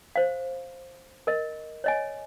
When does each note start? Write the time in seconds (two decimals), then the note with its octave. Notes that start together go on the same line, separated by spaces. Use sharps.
0.16 C5 F5
1.27 A#4 D#5
1.84 C#5 D#5 G#5